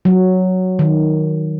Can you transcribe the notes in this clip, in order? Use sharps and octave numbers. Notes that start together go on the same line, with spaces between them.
F#3
D#3